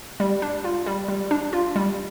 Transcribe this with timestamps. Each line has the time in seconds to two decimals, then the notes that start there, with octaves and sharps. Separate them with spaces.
0.20 G3
0.42 D4
0.64 F4
0.86 G3
1.08 G3
1.31 D4
1.53 F4
1.76 G3